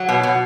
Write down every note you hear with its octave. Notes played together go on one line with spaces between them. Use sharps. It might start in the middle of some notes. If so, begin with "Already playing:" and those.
Already playing: F#3
B2
B2